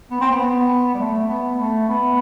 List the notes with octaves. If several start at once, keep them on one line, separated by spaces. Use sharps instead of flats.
B3
C4
B3
G3
A3
B3
A3
B3